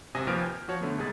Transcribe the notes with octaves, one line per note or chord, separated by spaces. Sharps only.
G#1 C3 G#5 D#6 A#6
D#2 F3 B4 G#5 F6 D7
G6 G#6
F3 F#4 C#5 A5
D3 A3 B3
C2 G#2 G#4 A6